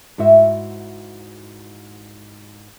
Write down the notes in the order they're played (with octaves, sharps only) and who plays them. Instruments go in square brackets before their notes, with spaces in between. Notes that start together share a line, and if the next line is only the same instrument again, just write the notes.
[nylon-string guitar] G#2 E4 F#4 E5